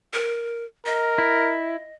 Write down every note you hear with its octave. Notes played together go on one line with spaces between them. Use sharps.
A#4
A#4 D#5
E4